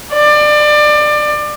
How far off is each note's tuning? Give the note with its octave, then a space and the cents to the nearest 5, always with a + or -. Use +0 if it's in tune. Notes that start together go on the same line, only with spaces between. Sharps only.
D5 +25